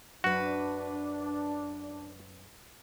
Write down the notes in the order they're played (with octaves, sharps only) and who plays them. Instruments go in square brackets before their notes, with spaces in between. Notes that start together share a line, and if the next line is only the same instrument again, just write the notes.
[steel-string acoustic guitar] F#2 B4 [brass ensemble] D4 [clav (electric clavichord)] F#4